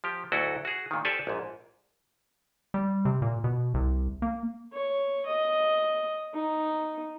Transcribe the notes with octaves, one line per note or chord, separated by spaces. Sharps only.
F3 G4
D2 F#3 E4 F#4 A4 D#5
F#4 G#4
A#2 D#3
G4 A4 C5 D5 G#5 A5
A#1 G#2
G3
C3
A#2
B2
C2
A#3
C#5
D#5
D#4